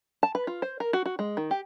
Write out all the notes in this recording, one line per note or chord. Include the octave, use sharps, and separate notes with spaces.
A5
B4
F4
C5
A#4
F#4
F#4
G#3
D#3
G4